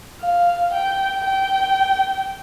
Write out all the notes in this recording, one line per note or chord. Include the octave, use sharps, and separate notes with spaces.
F5
G5
G5